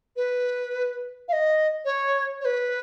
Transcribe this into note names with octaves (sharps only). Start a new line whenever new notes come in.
B4
F5
D#5
C#5
C#5
B4